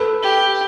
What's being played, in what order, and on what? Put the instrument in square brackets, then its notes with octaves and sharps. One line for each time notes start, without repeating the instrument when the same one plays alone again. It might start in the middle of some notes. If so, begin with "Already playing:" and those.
Already playing: [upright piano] A4 B4
[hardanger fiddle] G4